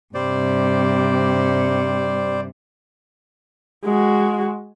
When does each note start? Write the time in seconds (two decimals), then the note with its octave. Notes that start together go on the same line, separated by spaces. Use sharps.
0.15 G2 C3 G3 C5 D5
3.85 G#3 F#4